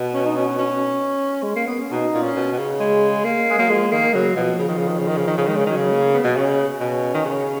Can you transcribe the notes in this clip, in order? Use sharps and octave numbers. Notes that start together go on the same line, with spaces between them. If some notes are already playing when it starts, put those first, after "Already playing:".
Already playing: B2
C#4
D#4
C#4
C#4
G#3
A#3
B3
C#4
B2 D#4
A#2
C#4
B2
B2
C#3
G#3
A#3
G#3
F#3 A#3
F3 G#3
D#3 A#3
C#3 F#3
B2 F3
C#3
D#3
C#3
D#3
C#3
D#3
C#3
D#3
C#3
D#3 G#3
C#3
D#3 F#3
C#3
A#3
B3
B2
C#3 C#4
B2
D#3
C#3